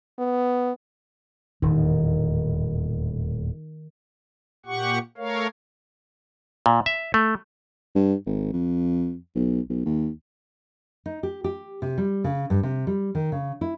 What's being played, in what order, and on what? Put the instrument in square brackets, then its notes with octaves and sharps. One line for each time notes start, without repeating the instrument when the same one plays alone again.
[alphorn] B3
[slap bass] D#1 E2 A2 [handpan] D#3
[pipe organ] A#2 G4 F#5 C#6
A3 A#4 C#5 F5
[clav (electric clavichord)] A#2
E5
A3
[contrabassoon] G2
G#1
F2
B1
B1
D#2
[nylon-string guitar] D#4
G4
G4
C3
G3
C#3
G2
C3
G3
D#3
C#3
E4